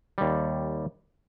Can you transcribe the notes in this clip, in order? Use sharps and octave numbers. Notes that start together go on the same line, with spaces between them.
D#2 G3